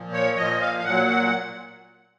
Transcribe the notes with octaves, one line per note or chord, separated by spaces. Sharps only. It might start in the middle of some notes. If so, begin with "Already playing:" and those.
Already playing: A#2 F3
C#5
A#2 F3 D#5
F5
F5
A#2 F#3 F#5